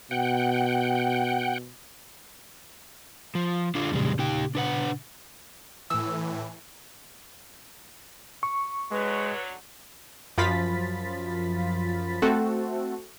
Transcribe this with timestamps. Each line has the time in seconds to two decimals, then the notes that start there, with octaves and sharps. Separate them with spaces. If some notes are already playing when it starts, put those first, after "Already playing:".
0.11 B2 F#5 G5
3.35 F3
3.75 D3 D4 F4
3.92 F2 A#2 C#3 G3 G#3
4.19 D#4 G4 G5
4.55 D4 B4 F#5
5.90 A2 E3 E6
8.43 C#6
8.91 D3 F#3 G#3 B4 C#5
10.38 F#2 F3 F4 B5 A6 B6
12.22 A3 C4 F#4 A4